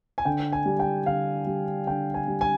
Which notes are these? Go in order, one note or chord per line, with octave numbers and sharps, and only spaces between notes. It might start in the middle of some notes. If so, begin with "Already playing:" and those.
G#5
D3 G5
G#5
G3
G5
D3 F5
G3
D3 G5
G#5
G3
G#5